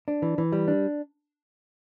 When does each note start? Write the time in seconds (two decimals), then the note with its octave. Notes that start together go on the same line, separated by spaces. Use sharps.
0.08 D4
0.22 E3
0.38 E3
0.52 G3
0.68 D4